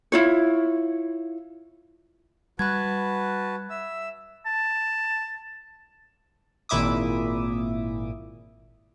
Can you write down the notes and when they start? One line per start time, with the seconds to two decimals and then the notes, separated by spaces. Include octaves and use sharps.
0.12 E4 F4 C#5
2.59 G3 F#4 B4 A5 B5 F#6 G#6
3.70 E5 E6
4.46 A5
6.69 G#1 A#2 E4 E5 D6 D#6